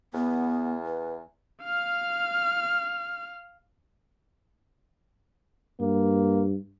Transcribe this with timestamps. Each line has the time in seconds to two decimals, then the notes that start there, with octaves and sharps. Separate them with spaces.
0.14 E2 B3
0.86 B4
1.63 F5 F6
5.81 G2 A#3